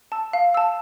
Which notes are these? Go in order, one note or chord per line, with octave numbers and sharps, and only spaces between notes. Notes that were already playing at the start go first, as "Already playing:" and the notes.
A5 E6
F5
A5 E6